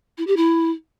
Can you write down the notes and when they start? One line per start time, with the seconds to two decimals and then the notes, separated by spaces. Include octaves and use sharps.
0.18 E4
0.27 G4
0.37 E4